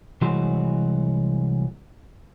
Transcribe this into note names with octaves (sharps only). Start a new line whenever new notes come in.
C2 E3 F#3 G#3 F#4 C6